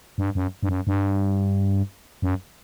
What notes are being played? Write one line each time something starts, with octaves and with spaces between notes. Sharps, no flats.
G2
F#2
G2
F#2
G2
F#2